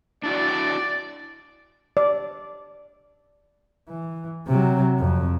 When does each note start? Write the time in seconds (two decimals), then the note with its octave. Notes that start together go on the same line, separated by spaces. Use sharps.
0.24 D4 E4 F#4 D5
1.97 D5
3.88 E3
4.47 C3 F#3
4.99 F2